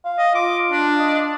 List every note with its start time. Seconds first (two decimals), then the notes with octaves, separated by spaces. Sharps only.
0.05 F5
0.18 D#5
0.35 F4 D6
0.71 D4
0.99 D#5